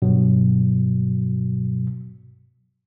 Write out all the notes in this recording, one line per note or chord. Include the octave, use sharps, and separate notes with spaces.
G2 B2 F#3